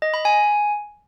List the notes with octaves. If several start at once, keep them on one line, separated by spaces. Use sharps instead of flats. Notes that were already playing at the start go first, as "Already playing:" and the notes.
D#5
B5
G#5